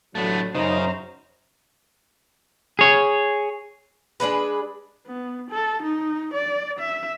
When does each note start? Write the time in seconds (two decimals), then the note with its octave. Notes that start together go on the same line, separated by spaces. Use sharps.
0.15 A1 D3 F#3 A3 B3
0.55 F#2 C#3 D#4 C5 A#5
2.79 G#4 C#5
4.20 G#3 D4 G#4 B4
5.06 B3
5.50 A4
5.82 D#4
6.33 D5
6.79 E5